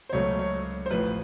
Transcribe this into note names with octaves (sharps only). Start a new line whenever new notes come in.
C5
C#2 C#3 F#3 A3 C#5
C#5
C5
A1 A2 F3 B4